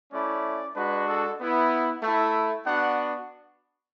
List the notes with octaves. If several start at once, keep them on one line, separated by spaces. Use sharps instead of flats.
A3 C#4 E4 D5
G#3 D4 F#4 B4
A4
B3 E4
A3 E4
B3 D4 F#4 F#5